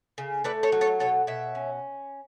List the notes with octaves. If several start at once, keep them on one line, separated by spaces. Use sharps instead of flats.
C#3
A3 B4 D5
A4 C#5
F#3
A4 C#5
B2 A4 C#5
B2 C#5 E5
C#4